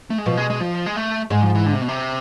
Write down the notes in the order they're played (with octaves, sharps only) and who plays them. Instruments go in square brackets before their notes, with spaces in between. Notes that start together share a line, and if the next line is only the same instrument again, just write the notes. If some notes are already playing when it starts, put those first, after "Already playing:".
[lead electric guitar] A3
G#3
[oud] B2 [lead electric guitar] F3
[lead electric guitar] G#3
G#3
F3
G#3
A3
[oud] G#2 [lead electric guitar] G#3
[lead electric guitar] F3
E3
D3
C3
B2
C3